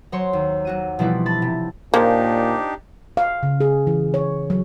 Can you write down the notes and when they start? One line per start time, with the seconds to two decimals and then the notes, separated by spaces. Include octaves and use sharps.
0.12 F#3 C5 C#5 C6 C#7
0.33 D#2
0.65 F#3 F#4 D#7
0.99 B2 E3 F3 G3 D4 E4
1.26 A5 B5 A6
1.42 C3
1.94 A#2 F3 A#3 D4 D#4 G4
3.17 F5
3.43 C#3
3.60 G#4
3.87 E3
4.14 C#5
4.50 F#3